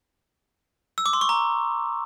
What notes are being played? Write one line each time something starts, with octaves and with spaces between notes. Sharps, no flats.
E6
D6
C6
C#6
A#5